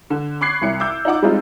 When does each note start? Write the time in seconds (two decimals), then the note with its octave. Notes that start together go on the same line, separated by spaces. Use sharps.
0.10 D3
0.41 B5 C#6 D6 F#6 G#6 C7
0.62 C2 C#7
0.80 D6 E6 G6
1.05 D#4 F4 F#5 D6
1.22 G3 G#3 C4 D#4 F4